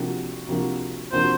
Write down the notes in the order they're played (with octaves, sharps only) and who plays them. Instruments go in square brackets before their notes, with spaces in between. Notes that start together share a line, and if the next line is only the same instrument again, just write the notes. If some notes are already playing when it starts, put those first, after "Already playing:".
Already playing: [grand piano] C3 F3 A#3 D4 F#4
C3 F3 A#3 D4 F#4
[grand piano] C3 F3 A#3 D4 F#4 [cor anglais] C5